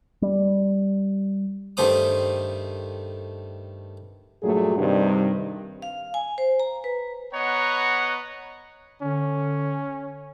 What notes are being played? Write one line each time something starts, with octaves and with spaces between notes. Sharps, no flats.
G3
G2 D#3 A3 C5 D6 D#6
G2 A#2 F#3 A3 G#4
G2 C3 D#3 G3
F5
G#5
C5
A#5
B4
B3 B4 C#5 D#5 F#5 A#5
D3 C#4